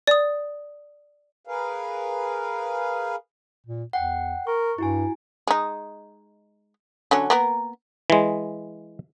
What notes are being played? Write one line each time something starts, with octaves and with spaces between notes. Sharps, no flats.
D5 D#6
G#4 A#4 B4 F5
A#2
E2 F#5 G5
A#4 C#6
G2 E4 F#4 G#5
G#3 D#4
D3 F#3 C#4
A#3 B3 A#4
E3 G#3